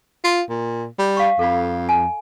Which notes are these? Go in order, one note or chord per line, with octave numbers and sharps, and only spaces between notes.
F4
A#2
G3
F5 C#6
F2 A4 F5 B5
G#5